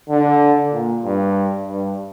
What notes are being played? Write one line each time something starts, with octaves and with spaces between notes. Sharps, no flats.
D3
A#2
G2
G2